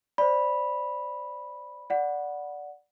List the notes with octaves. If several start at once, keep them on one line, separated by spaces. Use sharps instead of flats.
C5 D5 B5
D5 F#5